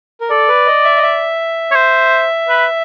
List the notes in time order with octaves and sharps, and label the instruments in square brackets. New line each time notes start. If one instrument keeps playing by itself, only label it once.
[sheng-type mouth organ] A#4
[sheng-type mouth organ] A4 [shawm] D5
[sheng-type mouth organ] B4
D#5
E5
D#5
E5
[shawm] C#5
C5
B4